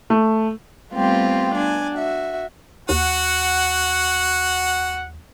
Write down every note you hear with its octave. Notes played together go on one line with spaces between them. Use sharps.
A3
G3 A3 B3 C4 F4 G4
D4 G#5
F#4 E5
D#2 F#4 F#5